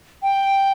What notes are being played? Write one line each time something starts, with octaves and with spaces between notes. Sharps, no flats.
G5